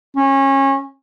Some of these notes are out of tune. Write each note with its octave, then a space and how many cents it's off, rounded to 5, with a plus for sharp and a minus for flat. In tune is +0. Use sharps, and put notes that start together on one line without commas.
C#4 -25